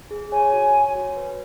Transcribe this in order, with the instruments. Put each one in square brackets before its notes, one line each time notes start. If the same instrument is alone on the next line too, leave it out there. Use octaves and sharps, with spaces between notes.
[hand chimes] G#4
[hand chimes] C#5 [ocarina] G#5
[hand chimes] F#4
C#5
F#4
B4